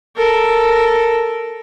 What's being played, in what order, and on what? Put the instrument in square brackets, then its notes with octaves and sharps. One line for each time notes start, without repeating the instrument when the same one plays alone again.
[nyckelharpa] A4 A#4